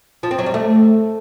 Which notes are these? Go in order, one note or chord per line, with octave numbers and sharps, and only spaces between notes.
F3
C4
F#3
G3
A3